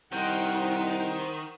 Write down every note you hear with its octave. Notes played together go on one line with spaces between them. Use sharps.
C2 D#3 C5 D#5 F#5 G5